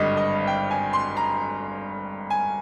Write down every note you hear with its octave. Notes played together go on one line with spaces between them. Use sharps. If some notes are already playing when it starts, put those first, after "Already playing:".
Already playing: G#1 G2 D3 G3 D#5
D#5
G5
G#5
C6
A#5
G#5